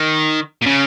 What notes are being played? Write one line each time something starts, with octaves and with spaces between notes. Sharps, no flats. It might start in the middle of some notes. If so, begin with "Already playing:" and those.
Already playing: D#3
A#2
C#3